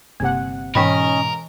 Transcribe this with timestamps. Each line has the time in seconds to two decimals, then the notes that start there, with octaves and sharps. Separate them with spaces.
0.20 G1 C3 A#3 F#5
0.75 G#2 B2 E3 C#4 A#4 D#5 G5 B5